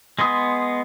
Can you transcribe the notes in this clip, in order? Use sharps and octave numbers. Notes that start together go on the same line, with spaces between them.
G#3 B3 C6 D#6